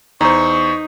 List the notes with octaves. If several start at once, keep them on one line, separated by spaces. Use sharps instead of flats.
E2 D#4 C5 C#6